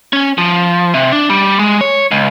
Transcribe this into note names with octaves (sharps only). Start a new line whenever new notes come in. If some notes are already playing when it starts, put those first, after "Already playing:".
C#4
F3
C3
D4
G3
G#3
C#5
C#2